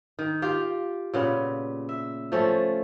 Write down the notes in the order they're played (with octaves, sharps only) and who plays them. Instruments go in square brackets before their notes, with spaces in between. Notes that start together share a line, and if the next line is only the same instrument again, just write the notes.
[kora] D#3
F4 G4 F5
A#2 C#3 B3
E5
F3 A3 C#4